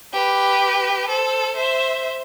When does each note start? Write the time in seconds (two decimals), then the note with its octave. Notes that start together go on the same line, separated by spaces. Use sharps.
0.13 G4 B4
1.08 A4 C5
1.55 C5 E5